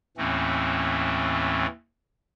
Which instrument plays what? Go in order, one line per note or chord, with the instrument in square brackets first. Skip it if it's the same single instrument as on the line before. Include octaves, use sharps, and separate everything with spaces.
[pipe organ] D#2 A2 E3 A3 C4 C#4